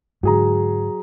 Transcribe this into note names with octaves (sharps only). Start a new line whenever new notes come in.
G#2 D3 F#3 G#4 A#5